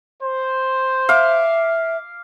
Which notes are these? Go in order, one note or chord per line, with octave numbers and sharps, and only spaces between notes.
C5
E5 F5 D6